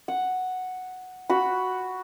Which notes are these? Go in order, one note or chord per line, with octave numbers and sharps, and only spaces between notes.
F#5
F#4 B5